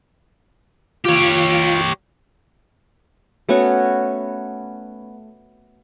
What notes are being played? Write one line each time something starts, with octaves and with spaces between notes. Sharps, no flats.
F4 G4 C#5
A3 B3 C#4 F#4